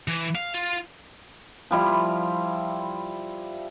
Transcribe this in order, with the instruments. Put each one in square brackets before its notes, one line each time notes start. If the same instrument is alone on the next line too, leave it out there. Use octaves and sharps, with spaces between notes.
[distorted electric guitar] E3
F5
F4
[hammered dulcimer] F3 G3 E4